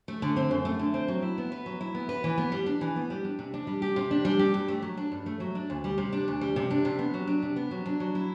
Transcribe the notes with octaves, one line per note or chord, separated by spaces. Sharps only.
A3
D3
C4
F#2
A3
D3
C4
F#3
E4
B3
B4
F#3
E4
B3
B4
E3
B3
G3
D4
E3
B3
G3
D4
C3
D4
G3
G4
C3
D4
G3
G4
G2
A3
F#3
D4
G2
A3
F#3
D4
D2
G3
C3
D4
D2
G3
C3
D4
C3
B3
F#3
D4
C3
B3
F#3
D4
F#3
E4